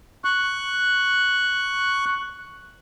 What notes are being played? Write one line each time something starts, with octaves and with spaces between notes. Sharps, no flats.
C#6 F#6